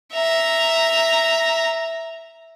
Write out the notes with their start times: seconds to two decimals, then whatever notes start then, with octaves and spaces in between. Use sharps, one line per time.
0.13 E5 A#5